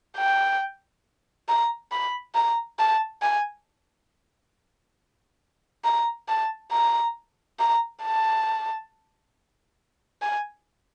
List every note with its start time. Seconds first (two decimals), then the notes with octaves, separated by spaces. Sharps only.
0.17 G5
1.48 A#5
1.92 B5
2.35 A#5
2.80 A5
3.22 G#5
5.85 A#5
6.28 A5
6.71 A#5
7.60 A#5
8.04 A5
10.22 G#5